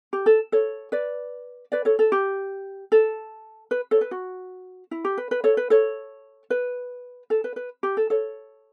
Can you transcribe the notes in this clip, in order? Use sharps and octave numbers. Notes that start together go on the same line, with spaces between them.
G4
A4
A4 C#5
B4 D5
B4 D5
A4 C#5
A4
G4
A4
B4
A4 C#5
B4
F#4
E4
G4
B4
B4
A4 C#5
B4
A4 C#5
B4
A4
B4
B4
G4
A4
A4 C#5